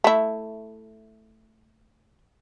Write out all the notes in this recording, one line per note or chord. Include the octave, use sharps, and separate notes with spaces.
A3 E4